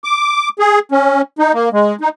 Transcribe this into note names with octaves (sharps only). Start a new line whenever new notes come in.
D6
G#4
C#4
D#4
A#3
G#3
D#4